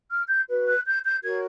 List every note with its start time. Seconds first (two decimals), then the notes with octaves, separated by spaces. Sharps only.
0.10 F6
0.28 G6
0.48 F#4 B4
0.66 F#6
0.85 G6
1.03 G6
1.22 F#4 A#4 C#5 G#6